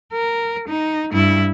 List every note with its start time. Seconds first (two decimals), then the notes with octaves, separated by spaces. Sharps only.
0.12 A#4
0.68 D#4
1.13 G2 E4